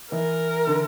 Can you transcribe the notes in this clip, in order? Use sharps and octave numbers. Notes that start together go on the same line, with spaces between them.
E3 A#4
D3